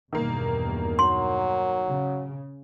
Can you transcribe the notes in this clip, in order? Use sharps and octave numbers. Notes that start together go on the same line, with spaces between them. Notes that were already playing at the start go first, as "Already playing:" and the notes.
E2 G2 B2 D#3 A#3
F#3 C6
C#3